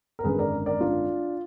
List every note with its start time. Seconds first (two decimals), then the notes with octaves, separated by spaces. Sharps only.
0.19 A#4
0.24 G#1 F#2 D3 G#4 B4
0.39 A#4 D5
0.66 A#4 D5
0.81 D4 F4